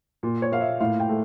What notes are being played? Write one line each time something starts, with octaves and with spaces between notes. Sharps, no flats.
A#2
C#5
A#3 F5
E5
A2 F5
G5
A3